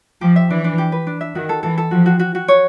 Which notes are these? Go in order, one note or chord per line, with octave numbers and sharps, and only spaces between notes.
F3 G4
E5
E3 D4
D4
G4
B4
D4
E5
D#3 F#4
A4
E3 A4
A4
F3 F#4
F#4
F#4
F#4
C#5